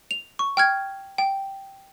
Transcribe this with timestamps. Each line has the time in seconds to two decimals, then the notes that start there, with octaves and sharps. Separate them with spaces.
0.11 F7
0.39 C#6
0.57 G5 F6 G#6
1.18 G5